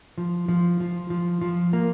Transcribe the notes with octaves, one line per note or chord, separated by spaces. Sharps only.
F3
F3
F3
F3
F3
A#3